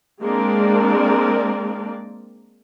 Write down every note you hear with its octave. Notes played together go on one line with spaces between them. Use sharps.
G#3 A#3 C4 D4 A#4 D5